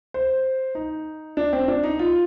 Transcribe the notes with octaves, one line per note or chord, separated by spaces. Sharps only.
C5
D#4
D4
C4
D4
D#4
F4